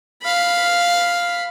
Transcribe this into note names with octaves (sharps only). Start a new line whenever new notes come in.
F5 B5